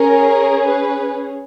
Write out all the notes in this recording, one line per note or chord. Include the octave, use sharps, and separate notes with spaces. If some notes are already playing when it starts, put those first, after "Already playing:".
Already playing: C#4 G#4 A#4
B4